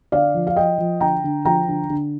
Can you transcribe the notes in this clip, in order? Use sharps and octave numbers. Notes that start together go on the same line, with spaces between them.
D3 D5 F5
F3
F5
F3 D#5 G5
F3
D3 G5 A#5
D3
F3 G5 A#5
D3
D3